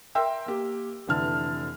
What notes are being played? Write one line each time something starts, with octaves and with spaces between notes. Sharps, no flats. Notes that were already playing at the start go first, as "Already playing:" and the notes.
A#4 E5 G5 C6 E6
A#3 G4
F1 D3 E3 A5 F6